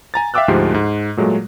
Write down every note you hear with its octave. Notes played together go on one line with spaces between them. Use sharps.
G#5 A#5 A6
E5 F5 G5 D6 E6 F#6
D2 G#2 F3 G4 C7
G#2
A#2 F#3 G#3 A3